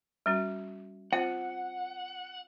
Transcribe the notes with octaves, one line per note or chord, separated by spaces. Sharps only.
G3 C#4 F#4
C4 F4 C5 F#5